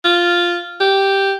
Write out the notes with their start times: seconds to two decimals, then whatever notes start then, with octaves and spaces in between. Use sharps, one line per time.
0.05 F4
0.80 G4